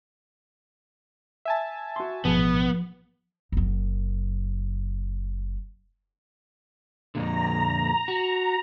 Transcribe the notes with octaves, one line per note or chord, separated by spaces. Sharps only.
E5 G#5 A5
F#4 C6
A1 G#2 B2 F3 B3 G#4
F#1 F#2
F2 A#2 D3 A#5
F#4